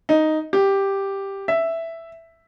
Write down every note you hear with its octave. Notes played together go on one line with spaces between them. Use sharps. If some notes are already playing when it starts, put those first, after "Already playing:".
D#4
G4
E5